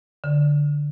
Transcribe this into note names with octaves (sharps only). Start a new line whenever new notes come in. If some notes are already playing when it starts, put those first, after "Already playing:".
D3